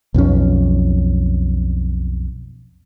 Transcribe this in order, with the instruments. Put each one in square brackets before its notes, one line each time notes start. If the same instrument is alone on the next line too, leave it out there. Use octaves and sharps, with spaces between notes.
[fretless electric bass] B1 F2 F#3 C#4